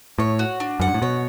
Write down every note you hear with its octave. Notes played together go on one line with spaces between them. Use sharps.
A2 C#5
F#4
D4
F#2 F#5
G2
A2
B2 C#5